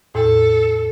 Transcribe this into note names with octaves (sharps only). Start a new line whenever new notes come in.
E2 A2 A4